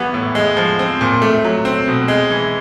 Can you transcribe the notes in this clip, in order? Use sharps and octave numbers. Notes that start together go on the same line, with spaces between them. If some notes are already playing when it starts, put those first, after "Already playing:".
Already playing: E3 G3 B3
A2
G#3
F3
C4
A#2
A3
F#3
C4
B2
G#3
E3